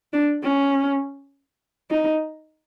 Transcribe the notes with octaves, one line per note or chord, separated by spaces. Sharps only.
D4
C#4
D#4